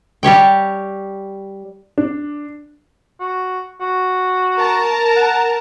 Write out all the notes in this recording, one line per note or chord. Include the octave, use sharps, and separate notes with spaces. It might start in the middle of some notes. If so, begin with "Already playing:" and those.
G3 G4 C#5 G5
D4
F#4
F#4
A#4 A5 A#5
F#5